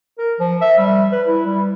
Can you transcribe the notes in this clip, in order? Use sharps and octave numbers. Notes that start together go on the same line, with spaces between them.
A#4
F3
E5
G3
B4
E4
G3